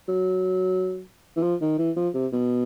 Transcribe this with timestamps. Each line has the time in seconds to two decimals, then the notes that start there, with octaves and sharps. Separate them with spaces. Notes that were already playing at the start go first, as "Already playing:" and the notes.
0.08 F#3
1.36 E3
1.43 F3
1.61 D#3
1.78 E3
1.96 F3
2.14 C3
2.33 B2